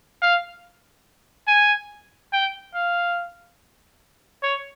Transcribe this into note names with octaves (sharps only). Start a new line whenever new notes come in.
F5
G#5
G5
F5
C#5